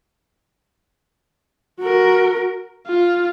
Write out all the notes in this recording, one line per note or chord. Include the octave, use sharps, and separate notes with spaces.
F#4 A#4
F4